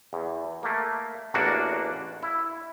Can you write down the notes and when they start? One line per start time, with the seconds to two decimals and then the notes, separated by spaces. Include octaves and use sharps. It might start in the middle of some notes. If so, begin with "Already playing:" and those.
0.13 E2
0.63 A3 A#3
1.34 A1 E2 A#3 D4 F#4
2.23 E4